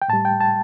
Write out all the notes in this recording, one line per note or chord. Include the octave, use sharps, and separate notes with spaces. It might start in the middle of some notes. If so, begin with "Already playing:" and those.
G5
A2 G3 A5
G5
A5